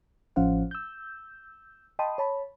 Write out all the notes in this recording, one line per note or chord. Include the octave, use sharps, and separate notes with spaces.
A1 F3 C#4 C5 F5 F#5
E6 G6
D#5 G5 A5 B5 C6 D#6
C#5 A5 B5